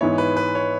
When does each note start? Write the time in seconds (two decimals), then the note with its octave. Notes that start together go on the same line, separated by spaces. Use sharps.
0.01 G#2 E3 B3 E4 C#5
0.18 B4
0.36 B4
0.55 C#5